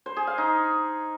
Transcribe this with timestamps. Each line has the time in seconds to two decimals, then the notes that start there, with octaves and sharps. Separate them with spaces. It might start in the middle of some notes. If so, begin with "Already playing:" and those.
0.06 C5
0.17 G#4
0.27 F5
0.38 D#4